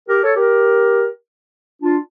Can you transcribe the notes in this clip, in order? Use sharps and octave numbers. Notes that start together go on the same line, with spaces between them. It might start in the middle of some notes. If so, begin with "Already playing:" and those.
G4 A#4
A4 C#5
G4 A#4
D4 F4